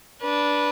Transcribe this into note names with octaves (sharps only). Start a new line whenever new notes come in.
D4 B4